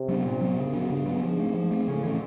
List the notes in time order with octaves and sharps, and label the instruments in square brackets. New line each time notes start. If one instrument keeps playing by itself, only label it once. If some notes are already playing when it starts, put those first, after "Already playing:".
Already playing: [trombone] C3
[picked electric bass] F#3 B3 D4
A#2
F#3 B3 D4
[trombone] F#2 [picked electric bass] C#3
[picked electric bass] F#3 B3 D4
[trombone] G2 [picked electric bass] C#3
[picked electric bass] F#3 B3 D4
[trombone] G#2 [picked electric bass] F3
[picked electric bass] A3 C4
F3
A3 C4
[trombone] A2 [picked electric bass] C#3
[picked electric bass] E3 A3 C#4